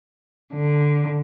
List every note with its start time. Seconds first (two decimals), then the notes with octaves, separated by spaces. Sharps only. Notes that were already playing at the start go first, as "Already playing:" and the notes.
0.53 D3